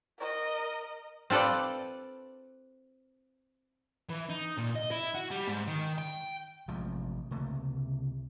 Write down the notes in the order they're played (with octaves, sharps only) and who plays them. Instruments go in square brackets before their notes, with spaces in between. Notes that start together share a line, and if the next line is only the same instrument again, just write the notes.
[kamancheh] A#4 D#5
[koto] C4 F4 A4 B4 D5
[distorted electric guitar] E3
D#4
A#2
D#5
E4
F#4
G3
G#2
D#3
G5
[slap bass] A1 C3 F3 G#3
C#2 C3 A3 A#3